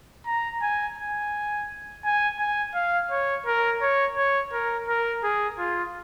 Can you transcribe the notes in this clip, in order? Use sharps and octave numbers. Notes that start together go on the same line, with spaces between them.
A#5
G#5
G#5
G#5
G#5
F5
C#5
A#4
C#5
C#5
A#4
A#4
G#4
F4